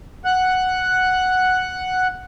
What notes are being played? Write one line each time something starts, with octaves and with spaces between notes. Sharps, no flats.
F#5 F#6